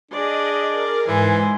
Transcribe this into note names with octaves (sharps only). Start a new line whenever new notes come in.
D4 G#4 D5 D#5
A#4
G#2 E3 C5 G#5